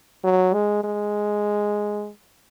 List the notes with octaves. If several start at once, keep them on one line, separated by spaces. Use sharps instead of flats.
F#3
G#3
G#3